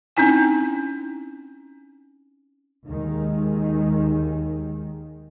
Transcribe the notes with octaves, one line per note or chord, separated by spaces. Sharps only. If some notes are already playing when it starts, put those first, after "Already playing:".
C4 C#4 D#4 E4 G5 G#5
D#2 D#3 G#3